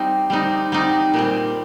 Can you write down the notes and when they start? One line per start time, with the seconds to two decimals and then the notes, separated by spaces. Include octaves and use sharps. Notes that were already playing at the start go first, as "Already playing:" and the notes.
Already playing: G3 C4 D#4
0.30 G3 C4 D#4
0.72 G3 C4 D#4
1.14 A#2 G3 C4